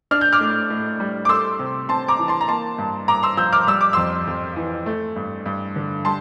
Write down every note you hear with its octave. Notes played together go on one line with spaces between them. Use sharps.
D4 F6
G6
D6 F6
A2
A2
G3
D6
A3 C6 E6
C3
C4 A5 C6
A#5 D6
E3
A5 C6
A#5
A#3 A5 C6
G2
G2 A#5 D6
C6 E6
F3 E6 G6
D6 F6
G3 E6
D6
F2 C6 E6
F2
E3
A3
G2
G2
D3
G3 A5 C6